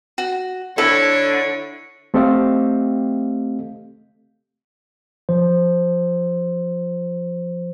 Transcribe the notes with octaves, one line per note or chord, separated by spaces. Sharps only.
F#4
D3 E4 A4 C#5
A3 C4 G4 A4 D#5 F5
F3 C5